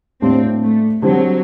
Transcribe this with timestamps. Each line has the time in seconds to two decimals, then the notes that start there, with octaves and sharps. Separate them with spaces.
0.21 A2 G3 A#3 C4 D4 G4
0.63 A3
1.02 D3 F#3 G3 C4